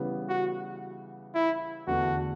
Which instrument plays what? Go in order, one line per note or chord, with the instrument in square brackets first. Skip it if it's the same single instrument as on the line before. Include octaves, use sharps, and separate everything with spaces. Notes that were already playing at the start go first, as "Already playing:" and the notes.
Already playing: [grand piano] C#3 E3 G3 B3
[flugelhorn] F#4
E4
[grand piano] E2 D3 A3 D4 [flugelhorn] F#4